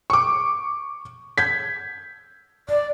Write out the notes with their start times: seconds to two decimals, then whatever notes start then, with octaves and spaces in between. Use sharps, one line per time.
0.10 C#6 D6
1.38 G6 G#6 B6
2.69 D5